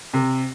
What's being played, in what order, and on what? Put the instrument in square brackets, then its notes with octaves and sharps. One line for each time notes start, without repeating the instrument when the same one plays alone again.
[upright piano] C3